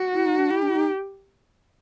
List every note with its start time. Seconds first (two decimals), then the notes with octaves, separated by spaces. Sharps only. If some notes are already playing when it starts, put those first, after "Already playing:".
Already playing: F#4
0.14 E4
0.26 D#4
0.38 D4
0.50 E4 G4
0.62 D4
0.69 E4
0.75 D#4